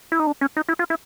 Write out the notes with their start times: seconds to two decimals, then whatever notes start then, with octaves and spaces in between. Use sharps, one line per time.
0.12 E4
0.20 D#4
0.27 D4
0.41 C#4
0.57 D#4
0.68 E4
0.79 F4
0.90 E4